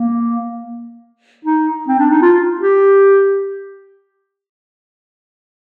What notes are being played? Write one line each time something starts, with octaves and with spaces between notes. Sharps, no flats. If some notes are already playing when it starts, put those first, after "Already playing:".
Already playing: A#3
D#4
C4
D4
D#4
F4
G4